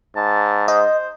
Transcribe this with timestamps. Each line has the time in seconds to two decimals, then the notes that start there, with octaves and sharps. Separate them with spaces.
0.16 G#2 A5
0.68 C5 D#5